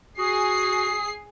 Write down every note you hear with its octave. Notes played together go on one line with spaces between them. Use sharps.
F#4 G#4 D#6 C7